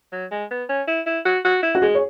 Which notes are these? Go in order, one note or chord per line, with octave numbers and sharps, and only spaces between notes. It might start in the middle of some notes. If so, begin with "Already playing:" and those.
F#3
G#3
B3
C#4
E4
E4
F#4
F#4
E4
F#4
G#3 G#4
C#5